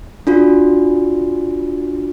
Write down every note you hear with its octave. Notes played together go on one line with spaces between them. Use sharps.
D4 F4 F#4